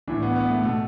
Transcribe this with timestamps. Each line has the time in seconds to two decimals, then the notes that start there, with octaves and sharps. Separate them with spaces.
0.08 A2 E3 D4
0.22 B3
0.36 B3
0.50 A3
0.63 B2 A3